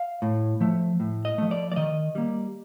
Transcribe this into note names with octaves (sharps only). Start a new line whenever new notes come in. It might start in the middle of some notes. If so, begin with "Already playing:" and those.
Already playing: F5
A2
F3 A3
A2
D#5
F3 A3
D5
D5
D#3 D#5
G3 A#3